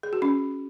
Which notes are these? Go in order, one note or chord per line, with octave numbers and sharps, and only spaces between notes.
G#4
F#4
C#4